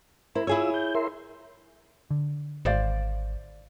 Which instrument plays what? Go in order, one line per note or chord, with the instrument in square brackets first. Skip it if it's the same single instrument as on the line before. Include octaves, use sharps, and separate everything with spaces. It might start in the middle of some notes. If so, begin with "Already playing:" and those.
[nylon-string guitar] E4 [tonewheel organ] A#4 C5
[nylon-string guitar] E4 G#4 C#5 [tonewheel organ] F4 E6
[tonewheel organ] G6
A#4 E5 C6
[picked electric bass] D3
[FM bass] G#1 [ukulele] C5 D5 F5